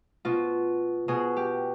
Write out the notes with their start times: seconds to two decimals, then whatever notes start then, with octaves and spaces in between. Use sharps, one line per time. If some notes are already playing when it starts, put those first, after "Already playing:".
0.25 B2 F4
1.08 B2 G#4
1.37 G4